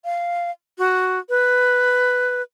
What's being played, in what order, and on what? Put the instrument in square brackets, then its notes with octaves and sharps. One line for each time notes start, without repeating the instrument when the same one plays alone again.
[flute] F5
F#4
B4